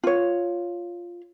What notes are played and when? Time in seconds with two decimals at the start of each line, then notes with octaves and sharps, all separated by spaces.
0.04 F4 C#5